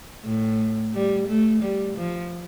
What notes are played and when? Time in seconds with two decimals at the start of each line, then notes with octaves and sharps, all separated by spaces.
0.25 A2
0.93 G3
1.27 A3
1.62 G3
1.96 F3